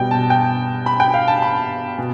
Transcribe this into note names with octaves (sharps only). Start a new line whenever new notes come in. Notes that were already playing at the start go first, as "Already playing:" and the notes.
Already playing: B2 G3 G5
A5
G5
B5
G5
F5
A5
B5
B2